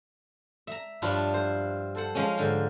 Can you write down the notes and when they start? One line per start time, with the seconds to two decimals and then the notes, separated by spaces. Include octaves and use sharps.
0.67 E5 A#5
1.02 G2 F3 D4 E4 F4 C#5
1.34 C5
1.95 A4 C5 F#5
2.15 F3 G#3 C#4
2.37 G#2 D3 F5 G5